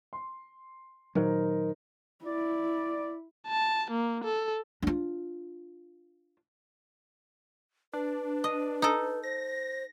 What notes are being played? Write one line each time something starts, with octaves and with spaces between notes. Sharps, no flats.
C6
A#2 D#3 F#3 D#4 A#4 C5
E4 D5
A5
A#3
A4
D4 F4
D4 B4
D#5
D#4 A4
C5 A#6